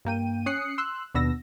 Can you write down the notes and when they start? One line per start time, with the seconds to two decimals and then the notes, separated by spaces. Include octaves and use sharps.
0.05 G2 A#3 G5 D#7
0.46 C#4 D#6 F#6 C7 C#7
0.78 C6 E6 F#6
1.14 D#2 B2 B3 D4 E6 A#6